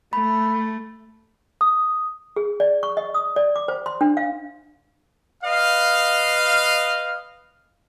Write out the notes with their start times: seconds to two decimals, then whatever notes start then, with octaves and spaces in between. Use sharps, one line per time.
0.13 A3 B5
1.61 D#6
2.36 G#4
2.60 D5
2.83 C#6
2.97 D#5
3.14 D#6
3.36 D5
3.56 D6
3.68 C5
3.86 C6
4.01 D4
4.17 F5
5.44 B4 D#5 F5